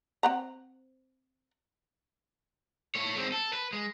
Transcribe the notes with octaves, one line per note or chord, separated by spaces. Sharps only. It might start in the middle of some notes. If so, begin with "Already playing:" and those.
C4 F#5 A#5
A3 C#5
G#3 C4
A4
B4
G#3